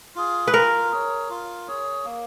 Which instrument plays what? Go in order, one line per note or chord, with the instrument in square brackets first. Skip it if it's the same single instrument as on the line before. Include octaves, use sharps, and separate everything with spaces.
[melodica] F4 G#4
[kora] B4
[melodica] F4 [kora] A#4
[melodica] G#4 C#5
F4
G#4 C#5
A#3